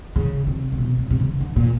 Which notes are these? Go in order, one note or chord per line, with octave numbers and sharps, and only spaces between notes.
C#3
C3
C3
B2
C3
C3
C#3
D3
A#2